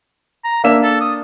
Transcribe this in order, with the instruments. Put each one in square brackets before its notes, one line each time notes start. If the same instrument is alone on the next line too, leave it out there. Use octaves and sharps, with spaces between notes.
[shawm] A#5
[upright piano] A#3 D4 E7 [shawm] E5
[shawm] A4
D#6